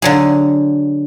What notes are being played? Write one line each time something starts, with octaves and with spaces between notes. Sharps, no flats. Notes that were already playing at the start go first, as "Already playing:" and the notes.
D3 F#3 G#4